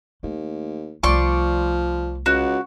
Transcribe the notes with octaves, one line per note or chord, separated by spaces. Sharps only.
D#2 A3
C2 F3 A3 D5 C6 C#6
C#2 F#4